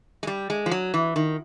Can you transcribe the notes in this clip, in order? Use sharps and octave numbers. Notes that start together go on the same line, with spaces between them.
G#3
G3
G#3
F3
F#3
E3
D#3